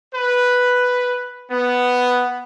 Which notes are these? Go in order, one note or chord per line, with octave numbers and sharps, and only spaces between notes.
B4
B3